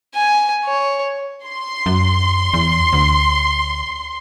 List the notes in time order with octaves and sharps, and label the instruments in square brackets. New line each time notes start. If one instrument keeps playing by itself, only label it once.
[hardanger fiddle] G#5
C#5
[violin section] C6
[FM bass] F#2
E2
D2